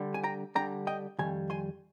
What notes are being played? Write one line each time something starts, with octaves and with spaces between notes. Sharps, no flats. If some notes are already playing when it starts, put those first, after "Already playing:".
Already playing: D3 G3 D4
G#5
G5 A#5
D3 G3 D4 G5 A#5
D#5 G5
F2 D#3 G3 G#5
G#5 C6